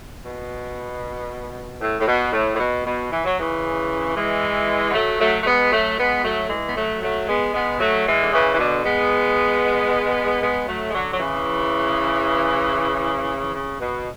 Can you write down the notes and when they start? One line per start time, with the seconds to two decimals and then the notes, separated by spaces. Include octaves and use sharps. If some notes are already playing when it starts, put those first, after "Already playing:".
0.24 B2
1.81 A2
2.00 A2
2.07 B2
2.33 A2
2.55 A2
2.59 B2
2.85 B2
3.11 E3
3.25 F#3
3.39 C#3 E3
4.15 E3 G#3
4.90 B3
4.94 F#3 A3
5.20 F#3 A3
5.41 A3
5.46 G#3 B3
5.72 F#3 A3
5.98 G#3 B3
6.24 F#3 A3
6.50 E3 G#3
6.66 B3
6.76 F#3 A3
7.02 F#3 A3
7.28 G#3 B3
7.54 G#3 B3
7.80 F#3 A3
8.07 E3 G#3
8.21 D3
8.32 C#3 E3
8.54 E3
8.58 B2 D3
8.84 G#3 B3
10.42 G#3 B3
10.67 F#3 A3
10.89 G#3
10.94 D3 F#3
11.12 F#3
11.20 C#3 E3
13.54 C#3
13.80 B2